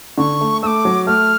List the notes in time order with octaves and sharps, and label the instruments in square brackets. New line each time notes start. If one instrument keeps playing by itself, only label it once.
[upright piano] D3 [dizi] C#6
[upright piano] A3
[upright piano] A3 [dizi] D6 E6
[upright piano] F#3
[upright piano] A3 [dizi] F6